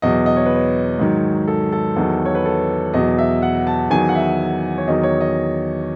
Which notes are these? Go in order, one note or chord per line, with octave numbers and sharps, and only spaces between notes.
E2 B2 F#3 D#5
D#5
C#5
B4
C#5
G#2 D#3 F#3
A4
A4
E2 D#3 F#3
C#5
B4
A4
E2 B2 F#3 D#5
E5
F#5
A5
E2 D#3 F#3 G#5
F#5
E5
C#5
E2 D#3 F#3 D#5
C#5
D#5